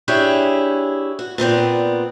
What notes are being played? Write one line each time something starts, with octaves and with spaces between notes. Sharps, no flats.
D4 E4 G4 G#4 C#5
F#4
A#2 B3 C4 D5